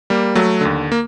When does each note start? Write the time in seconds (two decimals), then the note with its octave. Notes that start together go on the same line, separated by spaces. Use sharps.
0.10 G3 A#3
0.35 F#3 A3
0.61 D#2 D3
0.92 A#3